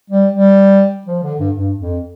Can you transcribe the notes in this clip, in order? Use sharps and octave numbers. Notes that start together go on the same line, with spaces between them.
G3
G3
F3
D3
G2
G2
F2